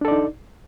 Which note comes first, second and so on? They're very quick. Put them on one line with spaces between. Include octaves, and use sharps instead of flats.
D4 A4 D5 D#4